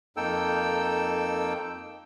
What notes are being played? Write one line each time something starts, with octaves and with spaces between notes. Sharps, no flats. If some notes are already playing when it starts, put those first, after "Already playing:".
F2 A#3 D#4 A4 G5 E6